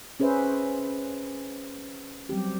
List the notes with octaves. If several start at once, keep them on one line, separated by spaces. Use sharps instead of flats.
C#4 G#4 B4 C5 E5
F#3 G3 C4 G4